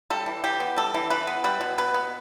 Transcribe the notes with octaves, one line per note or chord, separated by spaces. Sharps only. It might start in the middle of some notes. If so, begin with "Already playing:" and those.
G3 A4
E3
E3 G4
B3
G3 A4
E3
E3 B4
B3
G3 B4
B2
B2 B4
B3